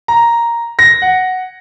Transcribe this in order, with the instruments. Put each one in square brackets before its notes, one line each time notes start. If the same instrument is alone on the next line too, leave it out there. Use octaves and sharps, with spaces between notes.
[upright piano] A#5
A#6
F#5